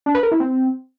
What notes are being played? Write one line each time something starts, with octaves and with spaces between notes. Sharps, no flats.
D4
B4
A#4
E4
C4